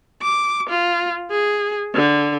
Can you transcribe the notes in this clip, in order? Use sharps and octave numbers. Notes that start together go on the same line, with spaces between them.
D6
F4
G#4
D3